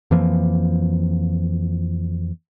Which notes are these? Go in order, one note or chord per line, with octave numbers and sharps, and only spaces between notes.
F2 E3 F3 A#3